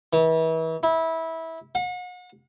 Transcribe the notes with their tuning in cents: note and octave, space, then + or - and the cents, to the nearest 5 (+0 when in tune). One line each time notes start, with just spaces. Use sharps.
E3 -35
E4 -20
F#5 -40